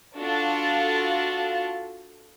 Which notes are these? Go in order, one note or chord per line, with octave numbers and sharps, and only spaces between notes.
D4 F4 F#4 A4 F5 A5